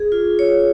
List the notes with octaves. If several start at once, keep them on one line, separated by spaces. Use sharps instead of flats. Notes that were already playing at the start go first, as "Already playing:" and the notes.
Already playing: G#4
F4
C#5